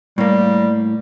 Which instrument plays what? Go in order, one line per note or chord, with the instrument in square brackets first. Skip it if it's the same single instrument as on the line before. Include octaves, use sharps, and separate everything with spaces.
[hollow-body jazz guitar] A2 A#3 [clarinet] G3